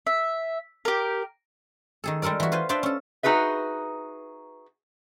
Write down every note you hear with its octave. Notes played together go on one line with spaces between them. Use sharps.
E5
G4 A#4
D#3 G#4 A4
G3 G#3 A4 A#4 D5
E3 F#4
F4 B4 C5 G#5
D4 F4 B4 C5 D5 E5
C#4 A4
D#4 F#4 G#4 B4 E5